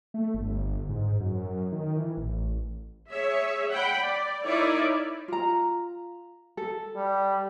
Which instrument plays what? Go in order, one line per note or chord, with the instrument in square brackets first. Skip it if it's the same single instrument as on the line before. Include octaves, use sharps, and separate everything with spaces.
[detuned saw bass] A3
G1
G#2
F#2
D#3
E3
A1
[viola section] G#4 C#5 E5
F#5 G5 B5
D5
D#4 E4 A#4 C#5 D5 E5
[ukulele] F4 A#5
A4
[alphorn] G3